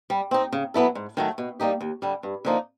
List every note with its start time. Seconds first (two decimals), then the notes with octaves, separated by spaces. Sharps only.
0.10 G3
0.31 C4 D#4
0.52 C#3
0.74 F#3 B3 E4 A4
0.95 G#2
1.17 D#3 F#3 A3
1.38 B2
1.60 G3 A#3 D#4 G4
1.81 D#2
2.02 D3 G3
2.23 G2
2.45 D3 F3 A#3 D#4